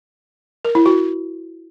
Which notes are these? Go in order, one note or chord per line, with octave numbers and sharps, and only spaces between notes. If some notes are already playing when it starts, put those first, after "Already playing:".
A#4
E4
F#4